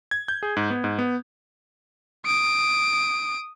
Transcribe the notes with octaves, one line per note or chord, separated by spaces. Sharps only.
G#6
G6
G#4
G#2
B3
G#2
B3
D#6 D7